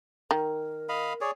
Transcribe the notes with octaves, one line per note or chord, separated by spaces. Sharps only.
D#3 A#4
D#5 F5 B5
G#4 C#5 D5